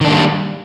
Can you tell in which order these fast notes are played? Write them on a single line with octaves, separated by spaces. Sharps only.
D#3 D4 A#3 G3